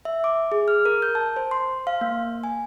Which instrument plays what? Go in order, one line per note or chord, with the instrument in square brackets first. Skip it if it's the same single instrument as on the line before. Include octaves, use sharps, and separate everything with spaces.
[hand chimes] E5
D6
G#4
F6
A#4
G6
A5
C5
C6
F5
A#3
G#5